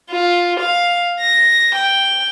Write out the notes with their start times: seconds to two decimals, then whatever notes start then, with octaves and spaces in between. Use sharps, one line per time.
0.11 F4
0.60 F5
1.21 A#6
1.75 G5